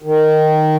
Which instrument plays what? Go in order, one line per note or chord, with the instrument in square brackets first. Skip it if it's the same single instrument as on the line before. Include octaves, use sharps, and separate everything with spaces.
[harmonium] D#3